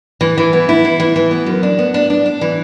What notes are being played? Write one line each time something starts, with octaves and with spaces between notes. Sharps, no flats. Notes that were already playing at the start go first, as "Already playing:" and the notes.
E3
E3
B3
E4
E3
E3
E3
B3
F#2
D4
B3
D4
D4
D4
E3